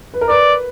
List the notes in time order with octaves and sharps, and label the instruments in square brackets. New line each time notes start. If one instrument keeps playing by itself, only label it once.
[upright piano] B4
A#4
[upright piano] B4 [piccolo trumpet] D5